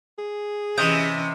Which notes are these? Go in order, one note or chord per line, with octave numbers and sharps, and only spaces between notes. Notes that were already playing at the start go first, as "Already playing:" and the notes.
G#4
C3 E3 C#4 D#5 D#6 G6